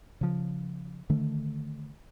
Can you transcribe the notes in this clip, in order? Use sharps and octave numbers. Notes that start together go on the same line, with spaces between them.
C#3 F3
D3 D#3 A3